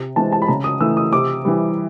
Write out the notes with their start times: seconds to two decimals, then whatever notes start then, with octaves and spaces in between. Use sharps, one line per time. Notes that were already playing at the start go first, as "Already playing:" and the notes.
Already playing: C3
0.16 E3 G#3 C4 A5
0.32 A5
0.42 B5
0.48 C#3 A#5
0.64 D#6
0.81 E3 A3 E6
0.97 D#6
1.12 C3 D6
1.45 E3 G3